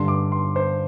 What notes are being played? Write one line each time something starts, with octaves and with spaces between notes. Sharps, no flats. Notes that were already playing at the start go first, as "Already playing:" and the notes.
Already playing: G2 D3 G3 C6
D6
C6
C5